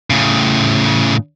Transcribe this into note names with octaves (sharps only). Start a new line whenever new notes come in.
A2 C#3